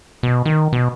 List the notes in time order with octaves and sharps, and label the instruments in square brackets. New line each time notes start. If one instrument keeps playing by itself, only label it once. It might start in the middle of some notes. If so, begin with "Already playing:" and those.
[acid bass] B2
D#3
B2